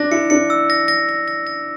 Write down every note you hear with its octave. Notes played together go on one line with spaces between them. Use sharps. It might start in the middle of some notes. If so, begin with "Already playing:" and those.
Already playing: D4 A#6
E4 C#7
D4 C#7
E6
A#6
A#6
A#6
A#6
A#6